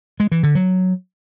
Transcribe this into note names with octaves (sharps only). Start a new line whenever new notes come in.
G#3
E3
D3
F#3